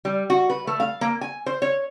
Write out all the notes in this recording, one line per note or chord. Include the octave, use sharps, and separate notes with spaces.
G3
F#4
B4
A3
F5
A#3
G#5
C5
C#5